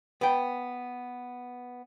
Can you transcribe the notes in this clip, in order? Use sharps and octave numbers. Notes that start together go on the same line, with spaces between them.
B3 B4 G5